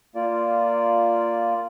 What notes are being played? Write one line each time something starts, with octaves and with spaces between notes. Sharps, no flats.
A#3 F4 D5